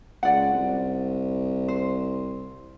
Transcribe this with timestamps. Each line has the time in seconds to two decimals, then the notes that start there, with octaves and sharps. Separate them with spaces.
0.23 C#2 D5 F#5
0.53 C2
1.68 C5